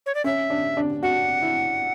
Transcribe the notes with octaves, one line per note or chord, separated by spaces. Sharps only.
C#5
D5
C#4 E5
D4
D4
F#4 F#5
E4